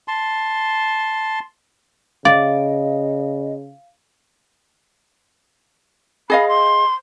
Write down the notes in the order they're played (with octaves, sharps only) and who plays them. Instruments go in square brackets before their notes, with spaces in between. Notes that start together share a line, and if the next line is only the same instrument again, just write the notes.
[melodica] A5 C6
[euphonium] C#3 [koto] D5 [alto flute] D#5 [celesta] F5
[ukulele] G#4 D#5 F5 [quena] B5
[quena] C6